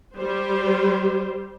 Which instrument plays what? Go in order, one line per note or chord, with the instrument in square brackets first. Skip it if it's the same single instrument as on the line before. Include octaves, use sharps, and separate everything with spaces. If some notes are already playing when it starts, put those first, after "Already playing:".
[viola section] G3 G4 C5